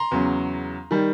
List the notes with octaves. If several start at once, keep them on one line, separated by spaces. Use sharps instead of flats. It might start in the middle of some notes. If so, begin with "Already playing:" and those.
Already playing: A#5 C6
E2 C#3 F#3
D#3 G3